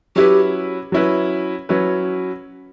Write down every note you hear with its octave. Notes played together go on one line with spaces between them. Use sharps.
F#3 C#4 E4 G4 B4
F#3 C#4 E4 B4
F#3 C#4 E4 B4